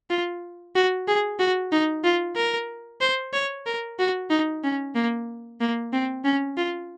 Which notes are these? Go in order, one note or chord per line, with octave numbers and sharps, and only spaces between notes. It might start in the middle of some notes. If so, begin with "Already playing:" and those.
F4
F#4
G#4
F#4
D#4
F4
A#4
C5
C#5
A#4
F#4
D#4
C#4
A#3
A#3
C4
C#4
F4